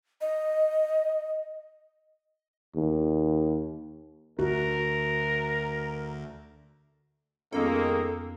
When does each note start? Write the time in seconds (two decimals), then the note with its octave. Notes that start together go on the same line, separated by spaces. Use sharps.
0.21 D#5
2.76 D#2
4.39 D2 F#4 A#4
7.52 F2 D#3 G#3 A#3 B3 C#4 A4